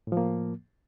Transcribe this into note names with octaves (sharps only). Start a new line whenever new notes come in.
A2 F3 A#3